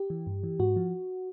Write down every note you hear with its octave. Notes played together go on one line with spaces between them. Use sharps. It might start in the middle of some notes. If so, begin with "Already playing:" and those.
Already playing: G4
E3
G2
E3
G#2 F#4
F3